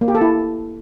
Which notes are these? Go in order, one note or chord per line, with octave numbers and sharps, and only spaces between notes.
A#3
G4
A4
E4